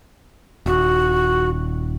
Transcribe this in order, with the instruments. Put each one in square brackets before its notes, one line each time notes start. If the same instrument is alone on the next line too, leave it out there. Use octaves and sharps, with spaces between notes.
[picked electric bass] D#1 [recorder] F#4